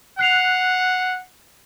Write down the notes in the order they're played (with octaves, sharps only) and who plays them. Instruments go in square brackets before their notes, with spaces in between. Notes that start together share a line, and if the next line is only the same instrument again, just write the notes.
[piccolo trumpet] F#5 [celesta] F#6 C7 F7